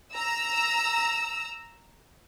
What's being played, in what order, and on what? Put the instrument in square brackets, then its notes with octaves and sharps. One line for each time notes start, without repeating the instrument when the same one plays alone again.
[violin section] A#5 E6